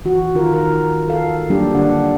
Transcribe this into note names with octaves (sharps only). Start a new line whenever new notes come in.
E3 F#4
D#3 F4 A#4
A#4
A4 F5
F#3 G3 A#3 D4 G4
D3 D4 F#5